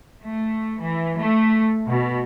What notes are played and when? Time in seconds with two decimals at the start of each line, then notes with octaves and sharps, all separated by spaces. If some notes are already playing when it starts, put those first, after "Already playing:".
0.24 A3
0.81 E3
1.18 A3
1.87 B2